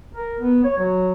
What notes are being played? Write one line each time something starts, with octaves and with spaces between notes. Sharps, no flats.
A#4
B3
C#5
F#3